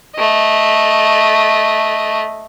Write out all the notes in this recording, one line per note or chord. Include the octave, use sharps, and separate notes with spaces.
A3 D#5